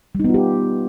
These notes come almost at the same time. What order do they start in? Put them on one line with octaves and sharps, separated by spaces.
G3 D#4 B3 F4 G4